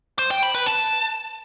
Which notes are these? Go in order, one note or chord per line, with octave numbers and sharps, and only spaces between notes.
C5
G5
B5
B4
A5